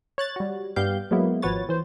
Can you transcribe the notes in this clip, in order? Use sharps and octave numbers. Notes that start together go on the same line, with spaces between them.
C#5 F#6 A6
G3 F#4
G2 G3 B3 G4 F5 G6
F#3 G#3 A#3 B3 E4
G#1 F3 F#4 B4 C#5 A6
E3 C5